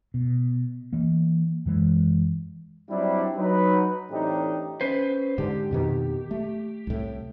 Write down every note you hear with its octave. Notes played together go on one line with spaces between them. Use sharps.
B2
E3 A#3
F#2 E3 G#3
F#3 G3 C4 D4 E4
F#3 D#4 B4
A2 E3 C4 D4 D#4 G4
C#4 B4 C5
G#2 D3 G4
F2 B2 D#3
A3
C2 A2